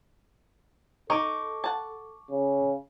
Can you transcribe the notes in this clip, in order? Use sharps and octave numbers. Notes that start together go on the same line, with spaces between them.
D#4 A4 C#6 D6
F#5 A5
C#3